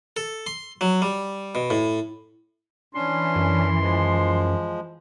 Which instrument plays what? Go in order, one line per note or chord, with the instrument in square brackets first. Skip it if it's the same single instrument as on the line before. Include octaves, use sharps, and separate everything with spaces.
[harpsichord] A4
C6
F#3
G3
B2
A2
[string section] E3 [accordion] C#4 D4 [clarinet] C6
[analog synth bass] F#2
[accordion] F3 G#3